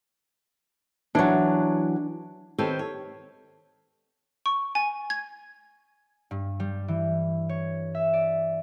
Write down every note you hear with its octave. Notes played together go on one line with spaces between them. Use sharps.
E3 F#3 D4
D#3 C4 G4 A4 B4 C#5
C#5
C#6
G#5
G#6
G2
G3
E3
C#5
E5
D5